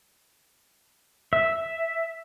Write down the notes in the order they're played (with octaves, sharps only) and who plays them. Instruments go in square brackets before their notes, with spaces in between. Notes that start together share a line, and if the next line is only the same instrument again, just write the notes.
[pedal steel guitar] E5